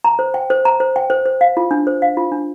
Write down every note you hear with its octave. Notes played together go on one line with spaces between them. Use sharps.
A#5
C5
G5
C5
A#5
C5
G5
C5
C5
F5
F4
D4
C5
F5
F4
D4